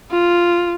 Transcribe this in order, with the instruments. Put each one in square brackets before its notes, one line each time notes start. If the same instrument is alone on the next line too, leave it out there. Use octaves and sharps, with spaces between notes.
[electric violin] F4